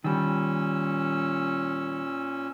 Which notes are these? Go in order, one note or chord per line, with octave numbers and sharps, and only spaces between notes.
A#2 D#3 G3 C#4 E6